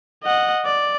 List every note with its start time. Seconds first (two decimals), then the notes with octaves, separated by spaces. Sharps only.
0.24 D#5 F#5
0.65 D5